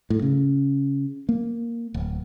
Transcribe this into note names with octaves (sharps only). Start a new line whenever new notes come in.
A2
C#3
A#3
D1